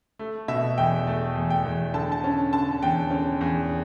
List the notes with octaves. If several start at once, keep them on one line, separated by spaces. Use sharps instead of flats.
A3
B2 E5
E2 G5
A3
E2
G5
E2
D3 A5
A5
C#4
D3 A5
E2 G5
C#4
E2